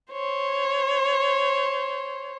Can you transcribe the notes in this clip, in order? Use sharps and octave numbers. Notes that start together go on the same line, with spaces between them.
C5 C#5